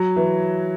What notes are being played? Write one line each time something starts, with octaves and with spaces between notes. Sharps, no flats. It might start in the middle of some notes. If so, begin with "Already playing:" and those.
Already playing: F#3
E3